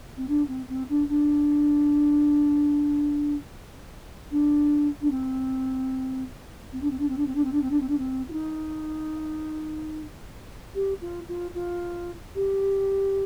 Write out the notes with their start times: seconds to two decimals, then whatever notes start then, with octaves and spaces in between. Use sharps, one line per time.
0.17 C4
0.28 D4
0.48 C4
0.69 C4
0.89 D4
1.09 D4
4.31 D4
5.01 D4
5.11 C4
6.73 C4
6.82 D4
6.91 C4
6.99 D4
7.09 C4
7.18 D4
7.26 C4
7.35 D4
7.44 C4
7.53 D4
7.62 C4
7.71 D4
7.81 C4
7.89 D4
7.98 C4
8.29 F4
8.32 D#4
10.75 G4
11.01 F4
11.28 F4
11.55 F4
12.35 G4